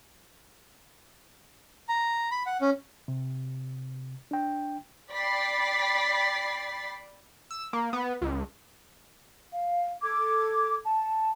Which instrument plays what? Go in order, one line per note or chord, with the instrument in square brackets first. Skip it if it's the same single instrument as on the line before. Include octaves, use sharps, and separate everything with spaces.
[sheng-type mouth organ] A#5
B5
F#5
C#4
[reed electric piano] C3
D4 G5
[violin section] D5 G5 B5 A6 B6 C7
[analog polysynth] E6
A#3
B3
C#2
[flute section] F5
A4 D6 G#6
A5